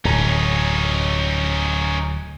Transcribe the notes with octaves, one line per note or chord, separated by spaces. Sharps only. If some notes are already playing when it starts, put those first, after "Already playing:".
D1 C#4 D#4